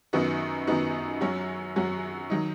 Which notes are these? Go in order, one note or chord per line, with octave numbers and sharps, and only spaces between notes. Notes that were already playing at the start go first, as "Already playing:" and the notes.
F#2 D#3 B3 D#4 F#4
F#2 D#3 B3 D#4 F#4
F#2 F#3 C#4 F#4
F#2 F#3 C#4 F#4
D#3 F#3 D#4